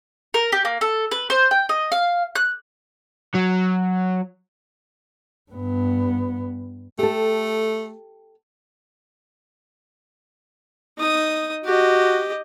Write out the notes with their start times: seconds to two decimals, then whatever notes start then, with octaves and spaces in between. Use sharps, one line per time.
0.34 A#4
0.52 G4
0.65 A#3
0.81 A4
1.11 B4
1.30 C5
1.51 G5
1.69 D#5
1.92 F5
2.35 F#6
3.34 F#3
5.51 G2 B3
6.99 A3 G4 A4
10.98 D#4 D#6
11.65 F#4 G4 D#5